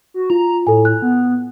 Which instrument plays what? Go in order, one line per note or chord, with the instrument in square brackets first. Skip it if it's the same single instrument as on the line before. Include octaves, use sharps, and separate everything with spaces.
[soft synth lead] F#4
[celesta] F4 [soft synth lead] A#5
[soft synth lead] A2 [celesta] A4 G#5
[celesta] F#6
[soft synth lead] B3